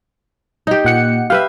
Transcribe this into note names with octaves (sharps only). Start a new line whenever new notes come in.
D#4 G4
A#2 F#5 C#7
G4 B4 E5 F5